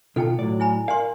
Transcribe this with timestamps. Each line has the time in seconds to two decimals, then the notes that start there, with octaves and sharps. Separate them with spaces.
0.16 B2 D#3 F4 A4 G5 A5
0.39 A2 F#3 D5
0.60 E4 G#5 B5
0.88 A#4 D5 F5 G#5 C6